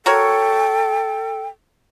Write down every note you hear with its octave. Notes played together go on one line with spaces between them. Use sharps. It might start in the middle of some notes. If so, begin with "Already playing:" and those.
F#4 A4 A#4 C#5 G5